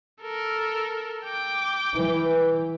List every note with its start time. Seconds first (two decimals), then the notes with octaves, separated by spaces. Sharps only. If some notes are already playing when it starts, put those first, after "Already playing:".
0.22 A4 A#4
1.25 G5 D6
1.95 E3